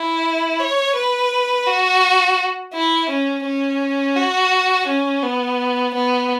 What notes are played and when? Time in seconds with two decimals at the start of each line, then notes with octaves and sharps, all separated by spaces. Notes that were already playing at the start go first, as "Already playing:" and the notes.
Already playing: E4
0.60 C#5
0.96 B4
1.67 F#4
2.74 E4
3.09 C#4
3.45 C#4
4.16 F#4
4.87 C#4
5.23 B3
5.94 B3